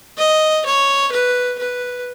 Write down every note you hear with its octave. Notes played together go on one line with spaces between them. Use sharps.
D#5
C#5
B4
B4